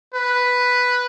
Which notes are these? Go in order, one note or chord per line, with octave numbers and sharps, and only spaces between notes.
B4